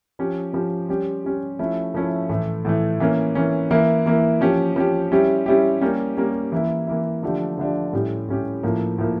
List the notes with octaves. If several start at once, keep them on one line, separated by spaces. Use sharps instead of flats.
F3 C#4 G4
F3 C#4 G4
G3 C#4 G4
G3 C#4 G4
F3 A3 C#4 E4
F3 A3 C#4 E4
A2 E3 A3
A2 E3 A3
E3 A#3 C#4
E3 A#3 C#4
E3 A#3 E4
E3 A#3 E4
F3 C#4 G4
F3 C#4 G4
G3 C#4 E4 G4
G3 C#4 E4 G4
G3 A#3 C#4 G4
G3 A#3 C#4 G4
E3 A#3 E4
E3 A#3 E4
D3 F3 A3 D4 G4
D3 F3 A3 D4 G4
A2 G3 C#4 G4
A2 G3 C#4 G4
A2 F3 A#3
A2 F3 A#3